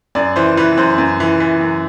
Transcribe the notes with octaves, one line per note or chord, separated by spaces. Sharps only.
F#2 D5
E3 C5
E3 B4
F#2 C5
F#2
E3
E3
F#2